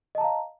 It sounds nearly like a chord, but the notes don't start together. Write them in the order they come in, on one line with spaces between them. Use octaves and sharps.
D#5 A5 A#5 F5